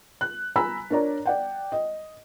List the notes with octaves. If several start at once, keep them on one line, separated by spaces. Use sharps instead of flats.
F#6
G#5 A#5 B5 E6 B6
D4 A#4 C#5 D5 A#5
D5 F#5 G5
D#5